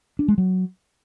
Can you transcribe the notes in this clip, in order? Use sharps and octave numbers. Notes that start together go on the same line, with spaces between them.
D4
G#3
F#3